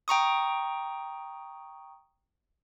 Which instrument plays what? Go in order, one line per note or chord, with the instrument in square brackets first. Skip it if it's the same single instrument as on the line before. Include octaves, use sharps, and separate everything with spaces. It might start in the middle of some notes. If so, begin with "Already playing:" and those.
[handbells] G5 A#5 C#6 D#6